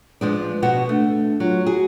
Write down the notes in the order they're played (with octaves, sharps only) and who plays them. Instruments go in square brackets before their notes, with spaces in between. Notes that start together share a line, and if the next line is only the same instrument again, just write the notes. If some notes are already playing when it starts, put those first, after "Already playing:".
[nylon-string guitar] F3 G#3 D4 [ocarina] B4
[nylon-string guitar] B2 B3 F#4
[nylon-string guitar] A3 [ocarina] D4
[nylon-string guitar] F#3 [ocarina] F4
[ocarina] F#4 [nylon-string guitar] G#4